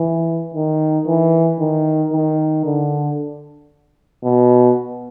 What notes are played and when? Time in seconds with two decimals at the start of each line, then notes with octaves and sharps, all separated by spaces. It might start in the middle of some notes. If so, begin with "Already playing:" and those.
Already playing: E3
0.54 D#3
1.07 E3
1.59 D#3
2.13 D#3
2.65 D3
4.24 B2